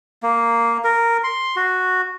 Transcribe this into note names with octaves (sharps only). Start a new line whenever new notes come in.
A#3
A#4
C6
F#4